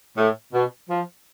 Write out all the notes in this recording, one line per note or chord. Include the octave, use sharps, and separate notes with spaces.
A2
B2
F3